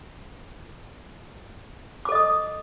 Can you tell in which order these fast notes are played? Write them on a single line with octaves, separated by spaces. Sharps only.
D6 A4 D#5 D#6